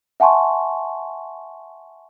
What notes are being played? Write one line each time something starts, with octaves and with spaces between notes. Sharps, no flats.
E5 F#5 G#5 A5 C6 C#6